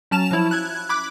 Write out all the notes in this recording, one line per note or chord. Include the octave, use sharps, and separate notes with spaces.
F#3 C#4 A5 E7 F7
F3 E4
F#6 G#6
B5 D6 F#6